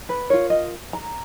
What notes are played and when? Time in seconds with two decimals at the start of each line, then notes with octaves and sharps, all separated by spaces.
0.09 B4
0.30 F4 A#4 C#5
0.50 D#5
0.93 A#5